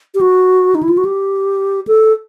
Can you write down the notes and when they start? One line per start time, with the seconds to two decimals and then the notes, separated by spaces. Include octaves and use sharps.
0.15 G4
0.21 F#4
0.75 D#4
0.83 E4
0.89 F4
0.97 F#4
1.05 G4
1.87 A4